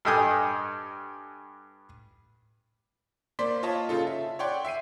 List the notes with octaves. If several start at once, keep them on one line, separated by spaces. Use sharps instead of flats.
G2 A4 D#5 G5 G#5 D#6
A#3 C5 D5 C6 B6
F4 C#5 D#5 A5
C#3 F4 A4
E5
C#5 D5 F#5 G5 C6
E5 G5 C7 D#7